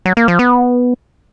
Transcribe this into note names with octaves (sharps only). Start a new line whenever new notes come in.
F#3
A#3
F3
B3